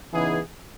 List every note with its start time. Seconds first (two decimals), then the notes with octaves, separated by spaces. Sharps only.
0.13 C#3 E3 B3 D#4 G#4